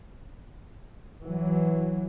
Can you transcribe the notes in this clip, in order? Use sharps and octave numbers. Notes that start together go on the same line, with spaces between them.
E3 F#3